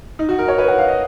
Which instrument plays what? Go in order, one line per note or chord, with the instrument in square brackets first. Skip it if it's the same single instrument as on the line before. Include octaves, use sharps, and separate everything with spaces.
[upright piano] D#4
F#4
A#4
C#5
B4
F#5
F5
D#5